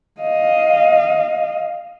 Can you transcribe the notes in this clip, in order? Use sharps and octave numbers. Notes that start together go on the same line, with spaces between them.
D#5 F5